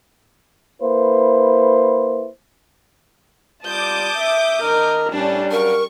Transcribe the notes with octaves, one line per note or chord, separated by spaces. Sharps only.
A#3 E4 B4 C5
G3 F4 D5 A5 D6 D#6 G6
E5
D#3 D4 A#4 D#5
A2 G3 C#4 D4
C#3 F#3 A#4 F5 C#6